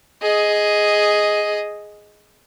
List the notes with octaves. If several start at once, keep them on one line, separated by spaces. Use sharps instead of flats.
G#4 D#5